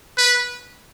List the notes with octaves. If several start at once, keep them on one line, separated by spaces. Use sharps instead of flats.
B4